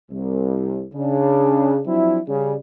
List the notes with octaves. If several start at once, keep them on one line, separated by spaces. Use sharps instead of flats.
C2
C#3 D4
F3 F#3 C4 D4 E4
C#3 G3